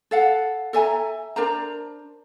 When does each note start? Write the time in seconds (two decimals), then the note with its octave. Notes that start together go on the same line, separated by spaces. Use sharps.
0.11 A4 F5 F#5
0.73 A4 E5 G#5 A#5
1.36 D4 A#4 C5 A#5